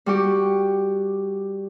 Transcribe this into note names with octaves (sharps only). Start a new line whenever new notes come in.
G3 F#4 G4